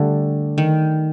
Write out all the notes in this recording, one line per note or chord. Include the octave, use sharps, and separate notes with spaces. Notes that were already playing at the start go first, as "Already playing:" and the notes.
Already playing: D3 G3 A3
D#3